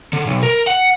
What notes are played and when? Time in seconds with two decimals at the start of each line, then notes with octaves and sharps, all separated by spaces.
0.13 D3
0.26 B1
0.43 A#4
0.67 F#5